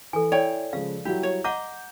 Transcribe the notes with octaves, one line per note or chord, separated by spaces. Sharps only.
E3 A4 G#5
E4 C#5 D5 G5
C#3 F3 G#3 F5
F#3 G3 E4 G4
C#5
D#5 F#5 A#5 D6 G6